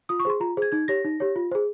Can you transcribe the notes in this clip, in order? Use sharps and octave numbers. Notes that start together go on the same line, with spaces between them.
F4 D#6
C#6
G#4 C5 C6
F4 A#5
G#4 C5 G#6
D#4 G#6
G4 C#5 A#6
D#4
G4 C#5
F4
G#4 C5